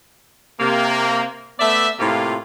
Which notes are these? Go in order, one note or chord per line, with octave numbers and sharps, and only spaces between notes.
C3 A#3
A3 B3 D5 E5
A2 C3 A#3 F4